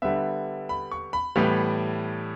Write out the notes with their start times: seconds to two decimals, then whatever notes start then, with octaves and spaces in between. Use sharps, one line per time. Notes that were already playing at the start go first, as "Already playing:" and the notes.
0.02 D3 G3 B3 E5
0.69 B5
0.92 C#6
1.13 B5
1.36 A2 E3 G3 B3